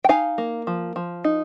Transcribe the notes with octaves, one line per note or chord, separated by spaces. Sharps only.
G5
D#4 F5 G#5
A#3
F3
F3
D#4